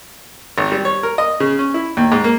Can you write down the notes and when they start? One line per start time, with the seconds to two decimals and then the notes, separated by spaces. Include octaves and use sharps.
0.58 G#1
0.72 G3
0.85 C#5
1.03 A#4
1.18 D#5
1.40 C#3
1.59 C#4
1.74 E4
1.97 D#2
2.12 G#2
2.24 A#3